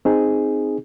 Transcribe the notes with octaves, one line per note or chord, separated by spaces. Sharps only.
C4 D#4 G#4